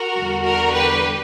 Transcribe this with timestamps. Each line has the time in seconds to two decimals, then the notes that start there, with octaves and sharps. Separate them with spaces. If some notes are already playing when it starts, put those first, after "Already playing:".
Already playing: F#4 A#4
0.15 E2 D3 G3
0.44 F#4 A#4
0.73 G4 B4